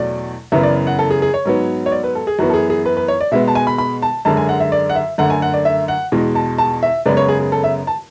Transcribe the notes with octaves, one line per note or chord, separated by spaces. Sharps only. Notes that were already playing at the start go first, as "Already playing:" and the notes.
Already playing: E2 B2 F#3 A3 D5
F#2 C#3 E3 B3 E5
D5
F#5
A4
G#4
G#4
C#5
G#2 F#3 B3
C#5
D5
B4
A4
G#4
F#2 E3 B3 F#4
A4
G#4
G#4
B4
B4
C#5
D5
B2 G#3 B3 E5
A5
G#5
B5
B5
A5
F#2 D3 G#3 A5
G#5
F#5
E5
D5
F#5
E5
F#2 D3 A3 F#5
G#5
F#5
D5
E5
F#5
E2 B2 G#3
A5
A5
E5
F#2 C#3 G#3 B3 D5
C#5
G#4
G#4
A4
E5
A5